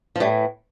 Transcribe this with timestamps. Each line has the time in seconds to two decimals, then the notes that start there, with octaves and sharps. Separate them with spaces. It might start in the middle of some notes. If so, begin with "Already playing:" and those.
0.16 F3
0.20 A2 E3 G3